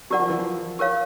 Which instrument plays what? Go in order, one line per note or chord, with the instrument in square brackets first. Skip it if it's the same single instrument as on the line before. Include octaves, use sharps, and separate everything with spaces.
[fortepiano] F#3 [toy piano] G4 A#4 D5 F#5
[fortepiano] F3
E3
F3
[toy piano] G4 A#4 C#5 F5